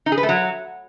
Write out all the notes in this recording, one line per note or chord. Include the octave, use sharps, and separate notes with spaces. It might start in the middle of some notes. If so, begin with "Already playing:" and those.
D#4
G#4
B4
A3
F#3